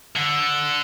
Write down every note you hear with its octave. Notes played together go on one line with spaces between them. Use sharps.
D3